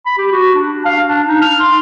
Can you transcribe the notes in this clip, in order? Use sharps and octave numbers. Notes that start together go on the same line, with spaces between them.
B5
G4
F#4
D4
F5
D4
D#4
F6
C6